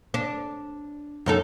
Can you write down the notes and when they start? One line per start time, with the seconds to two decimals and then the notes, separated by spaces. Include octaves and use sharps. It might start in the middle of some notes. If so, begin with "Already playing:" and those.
0.14 D4
1.26 F#2 D#4 A4